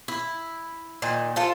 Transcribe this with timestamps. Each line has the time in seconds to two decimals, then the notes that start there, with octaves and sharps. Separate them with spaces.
0.08 E4
1.02 A#2 D#3
1.36 F4 A4 C5